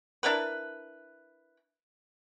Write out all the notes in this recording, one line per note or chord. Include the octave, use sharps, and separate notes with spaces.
D4 E4 A#4 B4